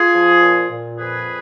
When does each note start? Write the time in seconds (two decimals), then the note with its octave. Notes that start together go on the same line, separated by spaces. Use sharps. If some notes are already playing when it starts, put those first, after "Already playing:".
Already playing: F4 G#4
0.14 F3
0.42 A#2
0.70 A#2
0.98 F2 G#4 B4